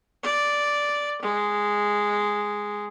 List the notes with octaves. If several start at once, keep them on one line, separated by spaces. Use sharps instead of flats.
D5
G#3